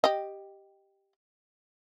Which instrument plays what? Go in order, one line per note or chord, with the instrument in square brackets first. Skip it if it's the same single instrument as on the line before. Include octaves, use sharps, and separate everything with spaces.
[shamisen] G4 D#5